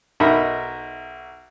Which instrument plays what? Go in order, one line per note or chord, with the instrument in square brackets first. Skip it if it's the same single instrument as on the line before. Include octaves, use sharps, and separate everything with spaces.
[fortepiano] B1 D#4 A#4 E5 A#5 B5